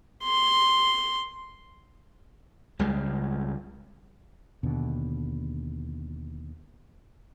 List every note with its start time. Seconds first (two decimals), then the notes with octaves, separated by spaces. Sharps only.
0.24 C6
2.79 C#2 C#3 G3 G#3
4.63 D#2 B2 D3